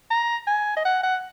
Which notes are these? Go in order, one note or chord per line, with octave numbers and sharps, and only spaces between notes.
A#5
G#5
D#5
F#5
F#5